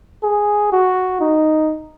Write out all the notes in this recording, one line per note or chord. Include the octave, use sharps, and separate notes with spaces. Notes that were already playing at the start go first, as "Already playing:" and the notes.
G#4
F#4
D#4